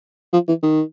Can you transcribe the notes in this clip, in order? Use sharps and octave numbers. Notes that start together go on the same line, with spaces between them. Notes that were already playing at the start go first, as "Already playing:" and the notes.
F3
E3
D#3